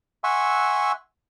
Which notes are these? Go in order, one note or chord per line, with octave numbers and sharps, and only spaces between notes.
E5 F#5 G#5 C6 C#6 E6